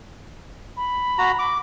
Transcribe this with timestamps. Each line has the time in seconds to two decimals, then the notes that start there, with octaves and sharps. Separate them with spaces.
0.77 B5
1.18 F#4 A#5
1.39 D6